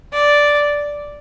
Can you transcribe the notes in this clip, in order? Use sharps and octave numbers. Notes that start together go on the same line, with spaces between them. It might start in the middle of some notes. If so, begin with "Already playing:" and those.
D5